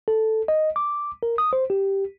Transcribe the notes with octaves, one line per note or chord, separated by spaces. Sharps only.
A4
D#5
D6
A#4
D#6
C5
G4